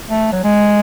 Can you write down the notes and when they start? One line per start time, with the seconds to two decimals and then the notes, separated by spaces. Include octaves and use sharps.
0.10 A3
0.32 F#3
0.44 G#3